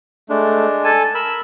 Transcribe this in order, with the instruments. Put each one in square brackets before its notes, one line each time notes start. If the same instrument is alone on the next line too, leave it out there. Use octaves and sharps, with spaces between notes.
[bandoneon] G#3 D4 [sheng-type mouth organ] A3
[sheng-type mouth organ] A4 G#5 A5
[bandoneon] A#4 B5 [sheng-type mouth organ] E6